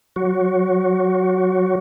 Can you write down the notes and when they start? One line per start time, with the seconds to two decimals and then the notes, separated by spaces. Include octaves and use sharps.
0.16 F#3 F#4